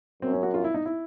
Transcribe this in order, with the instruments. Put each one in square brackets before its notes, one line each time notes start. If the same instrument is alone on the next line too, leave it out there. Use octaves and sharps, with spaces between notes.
[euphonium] F#2 [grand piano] C4
[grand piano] C#4
F#4
F4
E4
D#4
E4